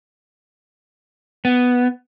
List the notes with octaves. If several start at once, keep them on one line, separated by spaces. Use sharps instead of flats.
B3